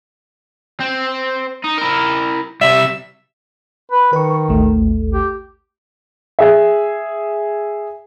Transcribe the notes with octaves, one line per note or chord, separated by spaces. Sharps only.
C4
D#4
E4 A#4
C3 G3 E5
B4
D#3 B4 C#6
A1 D#2 A3
G4
G#4 E5